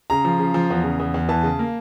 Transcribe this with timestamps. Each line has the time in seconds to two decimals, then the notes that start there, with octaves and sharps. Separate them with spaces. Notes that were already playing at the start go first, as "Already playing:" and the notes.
0.10 C#3 A#5
0.25 F3
0.39 C#3
0.54 F3
0.70 E2
0.84 C#3
1.00 E2
1.14 E2
1.29 E3 A5
1.43 C#3
1.59 A#3